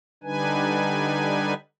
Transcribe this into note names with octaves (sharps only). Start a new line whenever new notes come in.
D3 G3 D4 D#4 B4 G#5